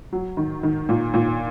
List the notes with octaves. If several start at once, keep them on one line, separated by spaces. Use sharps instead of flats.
F#3
D#3
D#3
A#2
A#2